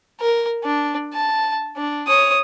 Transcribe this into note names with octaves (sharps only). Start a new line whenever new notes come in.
A#4
D4
A5
D4
C#5 D#6